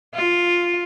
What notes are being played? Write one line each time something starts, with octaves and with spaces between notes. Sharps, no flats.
F4